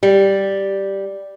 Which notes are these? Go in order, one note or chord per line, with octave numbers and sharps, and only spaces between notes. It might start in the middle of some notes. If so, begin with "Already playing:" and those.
G3